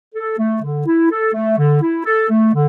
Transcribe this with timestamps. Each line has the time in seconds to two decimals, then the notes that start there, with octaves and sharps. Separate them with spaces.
0.15 A4
0.38 A3
0.62 D3
0.86 E4
1.10 A4
1.34 A3
1.57 D3
1.81 E4
2.05 A4
2.30 A3
2.53 D3